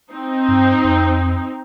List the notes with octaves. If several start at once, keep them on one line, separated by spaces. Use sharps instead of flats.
C4 D#4
G2
F2